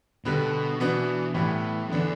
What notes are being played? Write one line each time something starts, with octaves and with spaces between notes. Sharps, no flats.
B2 D3 G3 B3
B2 E3 B3 D4
A2 E3 G3 B3 E4
E2 D3 B3 D4